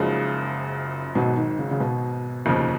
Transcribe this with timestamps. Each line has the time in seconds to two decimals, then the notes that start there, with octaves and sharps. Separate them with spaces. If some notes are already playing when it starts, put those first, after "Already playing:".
Already playing: F#1 F#2 C#3 F3 G#3 D#4
1.15 G#1 G#2 B2 F#3
1.37 D#3
1.59 C#3
1.71 C#3
1.80 B2
2.46 F1 D#2 C#3 F3